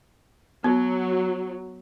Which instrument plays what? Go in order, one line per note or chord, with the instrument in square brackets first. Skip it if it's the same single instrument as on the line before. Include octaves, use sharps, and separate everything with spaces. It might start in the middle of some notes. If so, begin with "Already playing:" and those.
[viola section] F#3 [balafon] B3